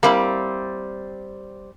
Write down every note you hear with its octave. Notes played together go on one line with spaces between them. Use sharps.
G3 A#3 C4 E4